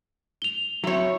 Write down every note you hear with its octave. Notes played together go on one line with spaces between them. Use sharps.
F7 G7
F#3 C4 E4 C#5